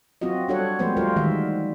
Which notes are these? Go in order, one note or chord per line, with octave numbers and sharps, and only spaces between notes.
F#3 C4 F4 F#4 D#5
G3 D4 F#4 A4 C#5 F#5
F3 G#3 A3 C4 B4 C5
G3 F4 F#4 A#4 C5
D#3 E3 G3 G#3 E5